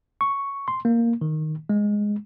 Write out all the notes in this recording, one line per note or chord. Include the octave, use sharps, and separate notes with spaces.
C#6
C6
A#3
D#3
G#3